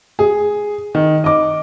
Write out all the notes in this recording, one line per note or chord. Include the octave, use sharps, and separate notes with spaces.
G#4
D#3
D#5 D6